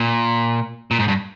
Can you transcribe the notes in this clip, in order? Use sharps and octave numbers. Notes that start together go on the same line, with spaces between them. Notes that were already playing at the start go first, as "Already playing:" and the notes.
Already playing: A#2
A#2
G#2
G2